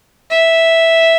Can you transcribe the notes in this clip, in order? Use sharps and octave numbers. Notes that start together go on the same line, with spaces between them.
E5